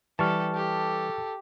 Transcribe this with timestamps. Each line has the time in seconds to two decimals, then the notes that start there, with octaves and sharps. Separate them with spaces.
0.19 E3 G3 G4 A4 A5 C#6 F6
0.54 G4 A4